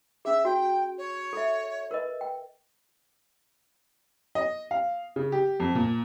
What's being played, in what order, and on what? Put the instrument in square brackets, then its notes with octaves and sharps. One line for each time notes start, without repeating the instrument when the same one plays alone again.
[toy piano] C#4 G#4 [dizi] E5
[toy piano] F#4 [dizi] G5
[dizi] C#5
[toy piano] A4 E5
A#4 B4 D#5
G5
[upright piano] D#5
F5
C#3
G4
F2
A#2